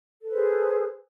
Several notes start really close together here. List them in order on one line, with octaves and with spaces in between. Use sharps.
A4 B4 C5 G#4